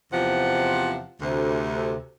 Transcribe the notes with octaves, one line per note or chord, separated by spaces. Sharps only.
E2 C3 F3 F#5
D2 C3